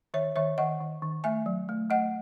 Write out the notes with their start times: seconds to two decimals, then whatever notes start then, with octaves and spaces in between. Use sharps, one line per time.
0.14 D#3 C#5 E5
0.36 D#3 C#5 E5
0.58 D#3 D#5 F#5
0.81 D#3
1.02 D#3
1.24 A3 E5 G#5
1.46 F#3
1.69 A3
1.90 A3 D#5 F#5